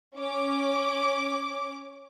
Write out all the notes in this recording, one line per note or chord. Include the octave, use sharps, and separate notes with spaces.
C#4 D6